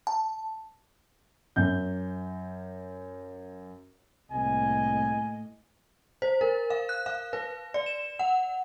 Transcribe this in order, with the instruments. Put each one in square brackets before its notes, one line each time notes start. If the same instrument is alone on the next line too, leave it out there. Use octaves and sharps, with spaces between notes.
[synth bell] A5
[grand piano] F#2 G6
[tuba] C2 [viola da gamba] A2 A#3 D#5 [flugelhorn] G#5
[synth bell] C5
A#4
F5
F#6
F5
B4
D5
E7
F#5